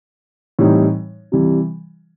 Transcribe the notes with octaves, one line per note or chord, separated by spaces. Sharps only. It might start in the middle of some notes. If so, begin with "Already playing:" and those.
A2 E3 G3 C4 D#4
C3 E3 G3